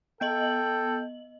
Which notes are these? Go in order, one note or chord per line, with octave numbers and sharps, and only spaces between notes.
B3 A4 D#5 G5 F#7